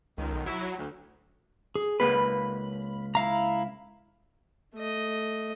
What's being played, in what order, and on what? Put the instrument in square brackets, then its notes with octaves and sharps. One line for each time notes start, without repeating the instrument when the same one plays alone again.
[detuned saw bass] C#2 [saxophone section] D#3
[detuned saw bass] B1
[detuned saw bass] F#3 [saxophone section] E4
[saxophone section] D2
[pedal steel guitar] G#4
[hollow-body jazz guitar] C#2 A#3 B4 [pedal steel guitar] B5
[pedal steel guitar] E4 F5 A#5
[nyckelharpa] A3 D#5